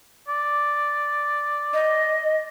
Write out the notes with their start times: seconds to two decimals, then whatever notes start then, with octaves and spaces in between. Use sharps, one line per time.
0.28 D5
1.73 D#5